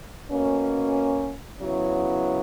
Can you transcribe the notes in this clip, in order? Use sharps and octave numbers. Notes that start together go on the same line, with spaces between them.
B2 A#3 C#4
C#3 F#3 B3 E4